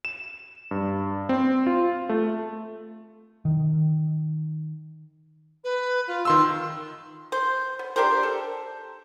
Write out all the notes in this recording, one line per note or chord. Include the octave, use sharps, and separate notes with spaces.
E7
G2
C4
F4
A3
D#3
B4
F4
D#3 C6 E6
C5
B3
D4 G4 A#4 C5
A4